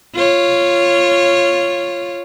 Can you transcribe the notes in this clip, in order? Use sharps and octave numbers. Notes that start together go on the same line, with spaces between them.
F4 C#5